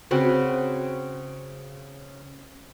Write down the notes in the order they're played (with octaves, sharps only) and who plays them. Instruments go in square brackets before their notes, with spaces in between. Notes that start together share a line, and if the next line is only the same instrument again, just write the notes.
[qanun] C#3 C4 F#4 B4